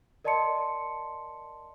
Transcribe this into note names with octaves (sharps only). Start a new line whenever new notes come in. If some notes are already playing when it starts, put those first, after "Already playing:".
A#4 D5 D#5 A5 C6 C#7